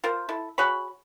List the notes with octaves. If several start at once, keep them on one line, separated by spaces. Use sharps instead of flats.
F4 A#4 C5
E4 A4
F#4 G#4 C#5 B5